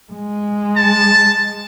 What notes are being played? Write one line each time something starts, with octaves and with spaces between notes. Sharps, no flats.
G#3
A5